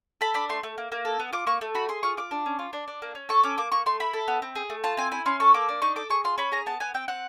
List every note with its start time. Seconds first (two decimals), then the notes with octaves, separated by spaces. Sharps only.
0.21 A4 B5
0.34 D4 B5
0.49 A3 C6
0.63 A3
0.78 A#3
0.92 A#3
1.05 A4
1.20 B3
1.33 F4 D6
1.47 A#3 C#6
1.61 A3
1.75 F#4 B5
1.89 G#4 C6
2.03 F4 C#6
2.17 F4 D6
2.31 D4
2.46 C#4
2.59 F4
2.73 D4
2.88 D4
3.02 A#3
3.15 C#4
3.29 A4 C#6
3.43 C#4 D6
3.58 A#3 D6
3.72 A#3 C#6
3.86 A3 C6
4.00 E4 B5
4.13 A4
4.28 B3
4.42 C4
4.55 G#4
4.70 A3
4.84 F4 A5
4.97 C4 G#5
5.12 E4 G#5
5.26 C#4 C6
5.40 A4 C#6
5.54 A#3 D6
5.69 D4
5.82 D#4 C#6
5.96 A4 D6
6.10 G#4 C#6
6.24 F4 C6
6.38 C#4 B5
6.52 G#4 A#5
6.66 B3 A5
6.80 B3 G#5
6.94 C4 G5
7.08 C4 F#5